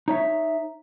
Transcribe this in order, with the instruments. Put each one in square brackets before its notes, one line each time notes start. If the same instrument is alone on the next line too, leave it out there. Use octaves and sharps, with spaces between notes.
[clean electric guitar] D#4 C#5 E5